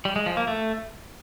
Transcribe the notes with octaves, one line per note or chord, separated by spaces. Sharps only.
G3
G#3
F3
A#3
A3